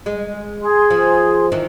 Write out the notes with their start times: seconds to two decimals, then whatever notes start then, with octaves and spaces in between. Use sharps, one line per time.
0.06 G#3
0.63 G#4 C6
0.90 F3
1.52 D#3 E3